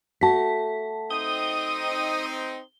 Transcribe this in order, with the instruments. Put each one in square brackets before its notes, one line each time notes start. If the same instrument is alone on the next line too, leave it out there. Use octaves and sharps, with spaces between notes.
[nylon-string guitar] A3 F#4 [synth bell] A5 B6
[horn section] C4 D#4 [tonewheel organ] D#6 [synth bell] G7